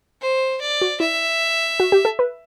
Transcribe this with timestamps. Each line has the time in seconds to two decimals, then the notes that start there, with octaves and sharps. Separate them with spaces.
0.22 C5
0.61 D5
0.81 F#4
1.00 E4 E5
1.80 F#4
1.92 G4
2.05 A4
2.19 B4